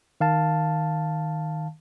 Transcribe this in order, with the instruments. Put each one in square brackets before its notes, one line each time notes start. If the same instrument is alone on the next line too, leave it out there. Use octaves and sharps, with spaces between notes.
[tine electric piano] D#3 F5 A5